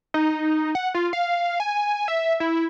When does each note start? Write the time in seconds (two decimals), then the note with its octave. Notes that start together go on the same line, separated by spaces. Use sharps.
0.14 D#4
0.30 D#4
0.75 F#5
0.95 F4
1.13 F5
1.60 G#5
2.08 E5
2.40 E4